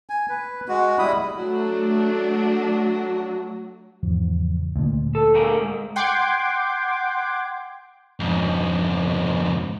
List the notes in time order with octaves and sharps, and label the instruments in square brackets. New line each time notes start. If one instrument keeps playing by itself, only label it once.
[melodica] G#5
B4
G#3 F#4
G3 E4 B5 D#6
[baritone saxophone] F#3 [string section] A3 D4
[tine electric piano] E2 G#2 C#3 E3 F3
[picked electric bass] D2 A#2
[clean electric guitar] A4
A3 G#4 A#4
G#2
[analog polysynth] F#5 G5 C6 D6 G#6
[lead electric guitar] F2 G#2